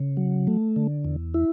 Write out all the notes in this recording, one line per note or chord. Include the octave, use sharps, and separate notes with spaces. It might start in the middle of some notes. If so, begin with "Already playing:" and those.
Already playing: C#3
F#3
A3
D3
E2
E4